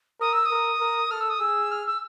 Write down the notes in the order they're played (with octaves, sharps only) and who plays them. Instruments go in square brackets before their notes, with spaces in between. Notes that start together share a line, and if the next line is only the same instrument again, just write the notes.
[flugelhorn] A#4 [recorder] D#6
[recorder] E6
D#6
[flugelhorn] A#4
A#4
[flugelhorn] A4 [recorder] F6
[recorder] E6
D#6
[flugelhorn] G#4 [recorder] E6
[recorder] F6
E6